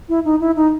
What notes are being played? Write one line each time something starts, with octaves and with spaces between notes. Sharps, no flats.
E4
D#4
E4
D#4